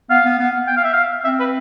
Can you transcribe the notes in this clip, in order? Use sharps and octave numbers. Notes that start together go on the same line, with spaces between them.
B3 F5
B3
B3
G5
F5
E5
F5
C4 E5
B4